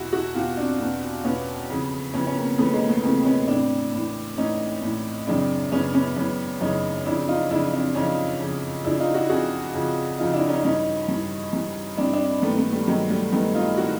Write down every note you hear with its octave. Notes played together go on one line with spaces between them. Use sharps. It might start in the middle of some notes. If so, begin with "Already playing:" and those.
Already playing: E2 B2 E4 F#4
E4 F#4
E2 B2 F4 G4
C4 D4
E2 B2
E2 B2 B3 C#4
F2 C#3 E3
F2 C#3 E3 B3 C#4
C#4
A#3 C4
F2 C#3 E3 A3 B3
G#3 A#3
A3 B3
F2 C#3 E3 A#3 C4
B3 C#4
A2 E3 C4 D4
A2 E3
A2 E3 C#4 D#4
A2 E3
F#2 C#3 E3 C4 D4
F#2 C#3 E3 B3 C#4
B3 C#4
F#2 C#3 E3 B3 C#4
F#2 C#3 E3 C#4 D#4
F2 C#3 F3 D4 E4
D#4 F4
F2 C#3 F3 D4 E4
C4 D4
F2 C#3 F3 C#4 D#4
F2 C#3 F3
F2 C#3 F3 D4 E4
D#4 F4
E4 F#4
F2 C#3 F3 F#4 G#4
F2 C#3 F3
F2 C#3 F3 D#4 F4
D4 E4
C#4 D#4
G2 E3 C#4 D#4
G2 E3
G2 E3
G2 E3 C4 D4
C4 D4
G2 D#3 A3 B3
A3 B3
G3 A3
G2 D#3 F#3 G#3
G3 A3
G2 D#3 A3 B3
D#4 F4
D#3 E4 F#4